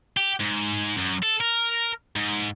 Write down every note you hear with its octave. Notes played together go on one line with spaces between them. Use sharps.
G4
G#2
F#2
A4
A#4
G#2